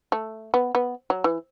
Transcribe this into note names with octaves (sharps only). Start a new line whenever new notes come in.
A3
B3
B3
F#3
E3